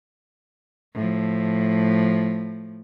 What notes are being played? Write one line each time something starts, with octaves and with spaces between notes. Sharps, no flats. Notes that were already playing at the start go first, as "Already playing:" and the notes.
A2 F3